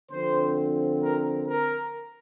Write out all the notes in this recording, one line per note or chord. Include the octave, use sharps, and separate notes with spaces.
D3 F3 C4 C5
A#4
A#4